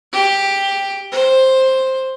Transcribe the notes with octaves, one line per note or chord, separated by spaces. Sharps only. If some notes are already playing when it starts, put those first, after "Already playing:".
G4
C5